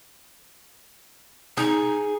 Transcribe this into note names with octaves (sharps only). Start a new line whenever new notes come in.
D#4 G#4